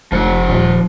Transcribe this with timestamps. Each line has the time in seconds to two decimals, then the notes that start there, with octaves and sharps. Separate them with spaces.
0.12 F1 F3 F#5
0.49 D#1